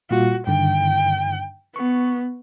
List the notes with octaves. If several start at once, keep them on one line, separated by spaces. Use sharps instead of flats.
A#2 G3 F4 F#4
G2 D3 D#3 G5
B3 C#6